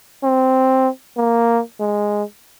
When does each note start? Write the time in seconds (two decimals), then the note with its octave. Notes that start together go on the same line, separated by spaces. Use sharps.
0.23 C4
1.17 A#3
1.79 G#3